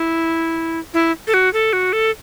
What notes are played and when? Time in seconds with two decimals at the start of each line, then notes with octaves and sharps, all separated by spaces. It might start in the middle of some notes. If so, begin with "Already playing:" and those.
Already playing: E4
0.94 E4
1.27 A4
1.34 F#4
1.53 A4
1.73 F#4
1.93 A4